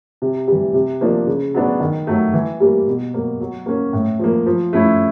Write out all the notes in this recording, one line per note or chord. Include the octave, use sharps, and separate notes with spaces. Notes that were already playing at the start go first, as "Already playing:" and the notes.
C3
E3 G3
C3
F3 A#3 D4
C#3
F#3 B3 D4
D#3
F#3 A3
E3
G3 A#3
B2
F#3 A#3
F#3
A#3 C#4
A2
F3 A#3
F3
A3 C#4 E4